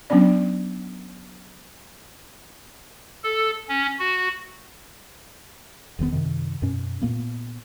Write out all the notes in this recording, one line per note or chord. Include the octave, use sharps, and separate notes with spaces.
F#3 B3 C#4 D4 D5
A4
C#4
F#4
E1 D#3 E3 B3
F#2 C3 D#3
F#2 B2 C#4
A#2 A#3 B3